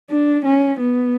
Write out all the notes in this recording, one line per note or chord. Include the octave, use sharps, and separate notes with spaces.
D4
C#4
B3